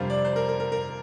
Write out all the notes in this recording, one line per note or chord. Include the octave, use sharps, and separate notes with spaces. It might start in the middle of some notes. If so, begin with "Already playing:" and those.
Already playing: F2 C3 G3 D4 F4 A#4 C5
D5
C5
A#4
A#4
A#4
A#4